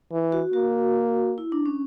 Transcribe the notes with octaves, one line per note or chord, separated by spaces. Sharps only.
E3
F#4
A#3 F#4
E4
D4
C#4